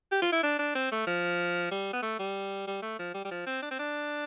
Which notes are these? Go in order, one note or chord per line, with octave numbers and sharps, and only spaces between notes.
G4
F4
E4
D4
D4
C4
A3
F3
G3
B3
A3
G3
G3
A3
F3
G3
G3
F3
C4
D4
C4
D4